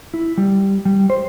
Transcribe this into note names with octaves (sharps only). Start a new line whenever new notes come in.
E4
G3
G3
C5